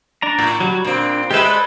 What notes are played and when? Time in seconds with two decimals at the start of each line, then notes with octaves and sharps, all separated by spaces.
0.22 D4 D5 A#5
0.39 A2
0.60 F#3 G3 F#4
0.85 A#2 C4 D4
1.31 G#3 G4 A4 B4 E5
1.44 C5 D5 F#6